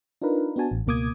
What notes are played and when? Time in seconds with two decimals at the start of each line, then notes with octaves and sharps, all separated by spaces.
0.22 D4 D#4 F4 A#4 B4
0.56 B3 D4 F#4 G#5 A5
0.71 A1
0.87 C#2 B2 A#3 D6 D#6 G#6